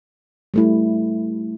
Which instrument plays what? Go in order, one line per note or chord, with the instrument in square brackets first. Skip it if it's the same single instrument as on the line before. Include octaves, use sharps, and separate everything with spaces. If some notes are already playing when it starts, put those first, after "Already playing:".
[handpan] G3 A3 E4